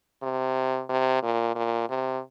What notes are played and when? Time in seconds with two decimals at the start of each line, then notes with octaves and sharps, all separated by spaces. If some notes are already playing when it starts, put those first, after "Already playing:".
0.22 C3
0.89 C3
1.23 A#2
1.55 A#2
1.89 C3